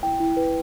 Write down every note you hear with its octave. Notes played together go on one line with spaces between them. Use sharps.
E4 G5
E4
B4